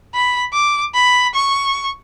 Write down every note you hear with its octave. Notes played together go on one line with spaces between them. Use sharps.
B5
D6
B5
C#6